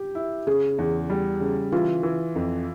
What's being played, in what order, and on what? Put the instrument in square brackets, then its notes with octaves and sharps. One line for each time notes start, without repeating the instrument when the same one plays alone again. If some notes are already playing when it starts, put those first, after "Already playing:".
Already playing: [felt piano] G4
[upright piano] E4
[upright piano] C#3 [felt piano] G#4
[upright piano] E2
G3
C#3
[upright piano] E3 [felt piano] F4
[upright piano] E3
F2